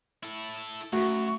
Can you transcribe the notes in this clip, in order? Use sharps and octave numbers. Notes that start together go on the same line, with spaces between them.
E4 A4
F#2 A3 F#4 C#6